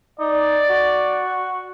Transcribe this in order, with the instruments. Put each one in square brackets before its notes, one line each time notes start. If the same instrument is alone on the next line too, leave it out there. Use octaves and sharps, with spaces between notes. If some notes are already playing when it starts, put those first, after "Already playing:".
[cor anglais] D#4 [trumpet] D5
[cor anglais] F#4